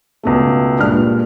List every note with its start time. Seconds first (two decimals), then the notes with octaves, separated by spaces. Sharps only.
0.23 C#2 B2 A3
0.78 G2 A#2 G#3 F6